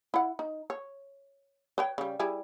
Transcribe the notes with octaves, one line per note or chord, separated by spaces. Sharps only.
E4 F#5
D#4
C#5
B4 C#5 G5
C#3 G3
G3 E4 G#4